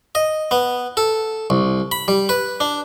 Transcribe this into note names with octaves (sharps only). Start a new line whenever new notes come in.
D#5
B3
A4
C2
B5
G3
B4
D4